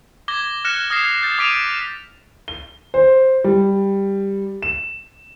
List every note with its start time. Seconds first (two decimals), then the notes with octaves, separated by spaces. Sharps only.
0.28 D6 G#6 A#6 G7
0.64 F6 F#6 A#6 C#7 E7
0.90 D#6 F6 G#6 A#6 C7 E7
1.23 G6 A6
1.39 D6 B6 D7 D#7 F7
2.48 G7
2.94 C5
3.44 G3
4.63 E7